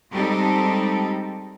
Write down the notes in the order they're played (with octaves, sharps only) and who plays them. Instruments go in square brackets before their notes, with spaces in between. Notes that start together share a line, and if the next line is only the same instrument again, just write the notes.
[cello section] G3 G#3 C4 D#4 G4 A4